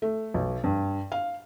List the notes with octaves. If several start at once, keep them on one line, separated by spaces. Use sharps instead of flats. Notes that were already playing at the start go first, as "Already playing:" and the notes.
A3
B1
G2
F5